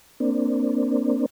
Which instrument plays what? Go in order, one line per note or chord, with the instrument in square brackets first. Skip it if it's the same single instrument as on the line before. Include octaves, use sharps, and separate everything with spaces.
[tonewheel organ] A#3 C4 D4